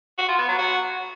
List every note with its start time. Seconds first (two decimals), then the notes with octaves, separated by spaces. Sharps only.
0.18 F#4
0.28 F4
0.38 B3
0.48 F#3
0.58 F#4